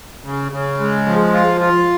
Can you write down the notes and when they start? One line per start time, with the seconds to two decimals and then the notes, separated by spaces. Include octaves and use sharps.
0.24 C#3
0.52 C#3
0.80 G#3
1.06 F3
1.33 F4
1.61 F4